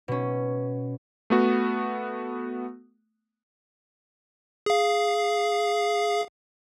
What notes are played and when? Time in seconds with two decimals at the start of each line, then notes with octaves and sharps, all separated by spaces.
0.08 B2 C#4
1.30 A3 B3 F#4
4.66 G#4 F5